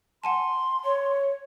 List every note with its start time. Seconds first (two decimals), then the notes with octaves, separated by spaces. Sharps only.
0.24 F#5 G#5 A5 C6
0.85 C#5